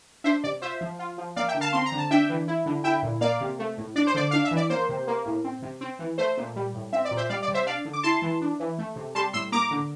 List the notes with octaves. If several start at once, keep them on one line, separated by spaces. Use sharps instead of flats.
D4 C5 E5
C3 D5
F4 C5 E5
F3
F4
F3
A#3 D5 F5
E5 G5
D3
F5 A5
C4 C6
A#5
D3
A5
D4 E5 G5
E3
E4
D3
E4 E5 G5
A#2
A#3 D5 F5
C3
A3
A2
D4 D5
C5
D3 D5
D4 F5
E5
E3
D5
A#3 C5
C3
A#3
A2
C4
C3
C4
E3
A3 C5
A#2
G3
A2
C4 E5
D5
A#2
C5 E5
G3 D5 F5
D5
C3
C5 E5
D4 D5 F5
D3
D6
E4 A5 C6
E3
D4
E3
A3
C3
G3 A5 C6
A2 C6 E6
A#3 A#5 D6
D3